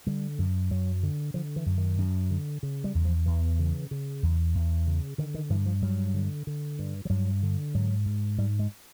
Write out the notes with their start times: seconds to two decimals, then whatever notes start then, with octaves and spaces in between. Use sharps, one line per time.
0.07 D3 G3
0.39 F#2
0.70 F#2 F#3
1.03 D3
1.34 D3 F3
1.56 E3
1.66 F#2
1.78 D#3
1.98 F#2
2.31 D3
2.63 C#3
2.84 G3
2.95 E2
3.05 F3
3.26 E2 E3
3.59 C#3
3.91 C#3
4.23 E2
4.55 E2
4.87 C#3
5.18 D3 D#3
5.34 D#3
5.50 G2 E3
5.66 F3
5.82 G2 F#3
6.14 D3
6.47 D3
6.79 G2
7.05 F3
7.10 G2 F#3
7.43 D3
7.75 G#2 F#3
8.06 G#2
8.38 G#2 G3
8.59 G#3